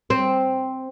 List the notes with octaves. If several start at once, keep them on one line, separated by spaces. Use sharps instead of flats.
C4